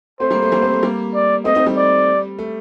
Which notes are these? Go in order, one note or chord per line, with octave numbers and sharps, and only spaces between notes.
A3 C4 C5
G3 A#3
A3
G3 A#3
A3 C4
A3
G3 A#3
D5
A3 C4 D#5
C4 D#4
G3
D5
A3